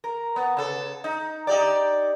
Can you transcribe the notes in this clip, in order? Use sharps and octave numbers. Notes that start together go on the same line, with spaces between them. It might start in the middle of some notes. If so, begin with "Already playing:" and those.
A#4
B3
C#3 A4
D#4
D#4 G4 D5